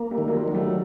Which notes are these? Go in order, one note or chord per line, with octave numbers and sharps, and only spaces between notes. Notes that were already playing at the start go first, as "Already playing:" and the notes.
Already playing: A#3
G3 A3
D#3
F#3
F3 G3
F#3 A#3
G3 A3